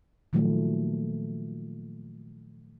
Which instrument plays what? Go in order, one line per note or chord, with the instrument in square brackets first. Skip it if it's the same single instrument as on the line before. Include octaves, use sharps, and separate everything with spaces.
[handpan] A#2 D#3 F3 F#3 A3